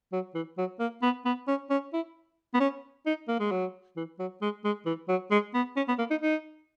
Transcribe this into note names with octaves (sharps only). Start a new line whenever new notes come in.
F#3
E3
F#3
A#3
B3
B3
C#4
C#4
E4
B3
C#4
D#4
A#3
G#3
F#3
E3
F#3
G#3
G#3
E3
F#3
G#3
B3
C#4
B3
A#3
D#4
D#4